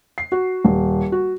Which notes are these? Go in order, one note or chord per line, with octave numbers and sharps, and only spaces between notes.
C7
F#4
D#1
F#4